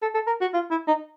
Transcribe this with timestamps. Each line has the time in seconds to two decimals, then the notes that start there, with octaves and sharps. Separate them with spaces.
0.02 A4
0.15 A4
0.27 A#4
0.41 F#4
0.54 F4
0.71 E4
0.88 D#4